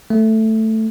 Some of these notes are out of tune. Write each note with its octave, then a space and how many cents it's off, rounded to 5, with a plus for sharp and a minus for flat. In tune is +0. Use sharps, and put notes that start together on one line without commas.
A3 +5